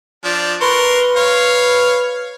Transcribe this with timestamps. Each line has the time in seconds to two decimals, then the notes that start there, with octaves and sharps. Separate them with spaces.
0.24 F3 D4
0.61 A#4 B4 C6 C#6
1.16 C#5 F5